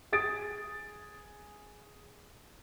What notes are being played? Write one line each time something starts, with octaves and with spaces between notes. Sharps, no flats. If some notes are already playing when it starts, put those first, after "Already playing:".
G#4 D#6 A6 D7